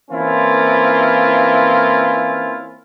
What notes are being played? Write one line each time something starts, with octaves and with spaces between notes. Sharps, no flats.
E3 A#3 C4 C#4 E4 F4